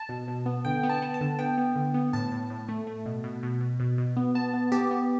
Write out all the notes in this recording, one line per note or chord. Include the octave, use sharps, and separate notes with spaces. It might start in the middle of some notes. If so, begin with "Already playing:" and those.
Already playing: A5
B2
B2
B3
D3 G5
B3
A5
B3
A5
D3
B3 G5
B3
D3
B3
A2 A5
A2
A2
A3
A3
B2
B2
B2
B2
B2
B2
B3
B3 A5
B3
B3 G4
B3